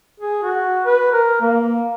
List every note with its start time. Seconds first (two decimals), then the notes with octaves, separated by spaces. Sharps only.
0.20 G#4
0.43 F#4
0.85 B4
1.12 A#4
1.41 A#3